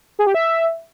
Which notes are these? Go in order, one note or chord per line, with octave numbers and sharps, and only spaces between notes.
G#4
G4
E5